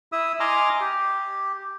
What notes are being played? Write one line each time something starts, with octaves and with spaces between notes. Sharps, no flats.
E4 E5 D#6 E6
D#5 G#5 A#5 C6 D6 F6
G4